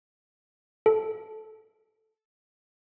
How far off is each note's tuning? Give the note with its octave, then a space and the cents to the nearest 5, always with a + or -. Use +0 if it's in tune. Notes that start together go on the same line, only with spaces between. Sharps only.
A4 -10